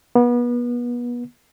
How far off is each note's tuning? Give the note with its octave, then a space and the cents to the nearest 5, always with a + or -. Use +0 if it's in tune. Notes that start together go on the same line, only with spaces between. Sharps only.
B3 -30